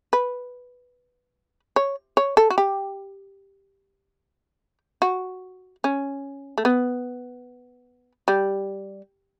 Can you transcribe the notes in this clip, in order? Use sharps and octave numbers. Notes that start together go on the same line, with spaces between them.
B4
C#5
C#5
A4
F#4
G4
F#4
C#4
A3
B3
G3